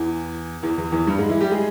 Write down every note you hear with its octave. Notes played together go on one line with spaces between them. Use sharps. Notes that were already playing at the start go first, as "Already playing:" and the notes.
Already playing: E2 E3
E2 E3
E2 E3
E2 E3
G2 G3
G#2 G#3
E3 E4
G3 G4
G#3 G#4